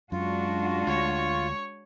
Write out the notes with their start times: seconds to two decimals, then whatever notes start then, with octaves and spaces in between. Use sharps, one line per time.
0.12 F#2 G#3 D4 F4 F#4
0.87 D2 C#5 C#6